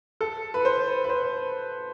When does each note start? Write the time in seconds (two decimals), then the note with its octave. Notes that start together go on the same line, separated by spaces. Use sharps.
0.21 A4
0.54 B4
0.65 C5
1.04 B4
1.09 C5